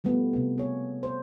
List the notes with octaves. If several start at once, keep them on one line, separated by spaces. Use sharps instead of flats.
F3 G3 A3 B3
C3 B3
G#4 C#5
C5